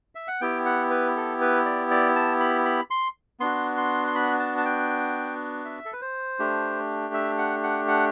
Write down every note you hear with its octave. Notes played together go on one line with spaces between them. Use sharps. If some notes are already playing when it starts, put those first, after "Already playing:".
E5
F#5
B3 E4 G4 G5
F#5
B4
A4
B4
D5
D5
A5
B5
B5
C6
B3 D4 F#4 C6
C6
C6
B5
A5
A5
G5
E5
A4
B4
C5
A3 D4 G4
E5
F#5
F#5
F#5